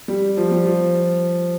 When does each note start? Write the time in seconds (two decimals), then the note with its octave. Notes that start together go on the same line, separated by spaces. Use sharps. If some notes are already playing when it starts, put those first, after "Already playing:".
0.08 G3
0.37 F3
0.51 G3
0.66 F3